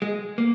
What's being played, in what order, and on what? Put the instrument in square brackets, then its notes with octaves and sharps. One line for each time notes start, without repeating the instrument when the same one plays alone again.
[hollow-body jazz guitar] G#3
A#3